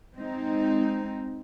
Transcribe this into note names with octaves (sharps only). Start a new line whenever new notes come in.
G#3 C4 D#4